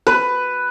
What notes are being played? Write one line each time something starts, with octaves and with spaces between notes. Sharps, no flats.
B4